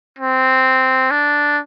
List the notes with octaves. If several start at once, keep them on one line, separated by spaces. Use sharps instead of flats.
C4
D4